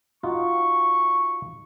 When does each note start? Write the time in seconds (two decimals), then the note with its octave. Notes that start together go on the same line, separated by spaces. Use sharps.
0.23 D#4 F4 F#4 C#6